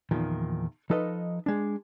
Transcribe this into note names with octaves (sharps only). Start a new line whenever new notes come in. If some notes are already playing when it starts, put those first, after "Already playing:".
E2 A#2 D#3 F3
F3 D#4 A4 B4 D#5
G#3 D4